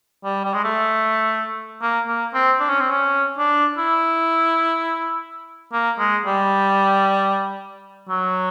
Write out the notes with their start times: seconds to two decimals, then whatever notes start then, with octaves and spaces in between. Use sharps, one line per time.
0.24 G3
0.45 G3
0.54 G#3
0.64 A3
1.82 A#3
2.08 A#3
2.34 C4
2.60 D4
2.69 C#4
2.80 C4
2.90 C#4
3.38 D4
3.78 E4
5.73 A#3
5.99 G#3
6.25 G3
8.09 F#3